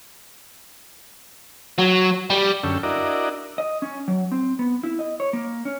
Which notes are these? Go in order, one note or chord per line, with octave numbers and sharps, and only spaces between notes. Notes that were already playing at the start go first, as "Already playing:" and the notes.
F#3
G3
F#2 D3 C#4 A4 G5 E6
D4 E4 F#4 A#4 D5 D#5
D#5
C#4
F#3
C4
B3
E4
D#5
C#5
A#3
C#4